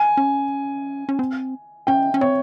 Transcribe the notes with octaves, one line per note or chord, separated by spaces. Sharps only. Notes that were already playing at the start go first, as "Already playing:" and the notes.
Already playing: G#5
C#4
C#4
C4
C#4 G5
C#4
C4 C#5